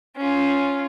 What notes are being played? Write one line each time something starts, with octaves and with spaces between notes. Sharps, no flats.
C#4 F4